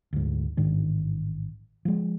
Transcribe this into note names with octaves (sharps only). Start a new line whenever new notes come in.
D2 G#2
A1 G#2 D#3 D4
F3 G#3